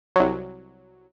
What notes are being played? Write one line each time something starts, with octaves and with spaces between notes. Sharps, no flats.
C2 F#3